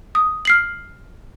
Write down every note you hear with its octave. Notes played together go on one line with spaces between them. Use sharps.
D#6
F6 C7 F#7